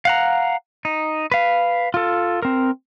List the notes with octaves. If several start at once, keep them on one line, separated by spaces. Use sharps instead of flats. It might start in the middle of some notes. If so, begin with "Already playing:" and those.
F5 F#5 A#5
D#4
B4 F5
F4 A4
C4 A#4